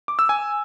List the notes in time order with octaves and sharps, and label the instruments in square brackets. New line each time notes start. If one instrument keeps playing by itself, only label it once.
[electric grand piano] D6
E6
G#5